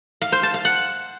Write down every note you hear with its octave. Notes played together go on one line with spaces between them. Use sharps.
F5
C5
A5
F5
F#5